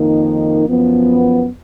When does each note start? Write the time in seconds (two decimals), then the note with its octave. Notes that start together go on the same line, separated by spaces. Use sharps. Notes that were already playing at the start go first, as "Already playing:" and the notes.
Already playing: F2 D#3 A#3 D#4
0.67 F#2 F3 B3